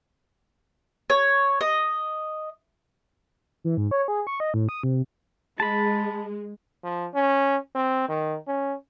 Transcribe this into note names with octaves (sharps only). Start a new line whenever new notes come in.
C#5
D#5
E3
G#2
C#5
G#4
C#6
D#5
A2
D#6
C3
G#3 A5 B5
F3
C#4
C4
D#3
C#4